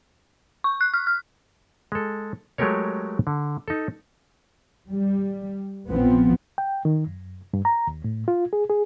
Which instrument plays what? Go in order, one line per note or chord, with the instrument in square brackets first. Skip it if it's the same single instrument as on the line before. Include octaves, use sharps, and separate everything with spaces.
[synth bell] C#6
F#6
F6
F6
[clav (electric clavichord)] G#3 A4
F#3 G#3 A3 G4 A#4 C#5
D3
D#4 A4
[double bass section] G3
A#1 F3 B3 C4
[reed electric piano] G5
D#3
F#2
G2
A#5
D#2
A2
F4
G#4
G#4